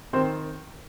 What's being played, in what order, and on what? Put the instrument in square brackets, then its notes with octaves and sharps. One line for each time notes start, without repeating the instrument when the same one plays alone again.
[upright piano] D#3 C4 C5